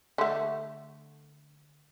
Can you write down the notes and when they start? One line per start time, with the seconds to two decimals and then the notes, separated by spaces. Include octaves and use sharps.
0.18 D3 A3